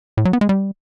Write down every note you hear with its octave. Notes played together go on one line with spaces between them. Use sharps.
A2
F#3
B3
G#3
G3